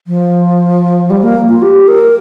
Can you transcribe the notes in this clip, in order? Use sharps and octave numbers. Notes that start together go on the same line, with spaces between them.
F3
G3
A#3
F4
G4
A#4